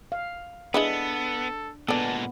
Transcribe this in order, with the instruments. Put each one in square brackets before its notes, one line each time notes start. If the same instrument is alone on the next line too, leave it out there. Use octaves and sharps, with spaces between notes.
[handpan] F5
[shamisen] G#3 E4 B4 [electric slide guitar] B3 [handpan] D4 [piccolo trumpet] A4
[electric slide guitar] A#2 G#3 [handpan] B3 [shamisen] D4 A4 [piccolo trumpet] A5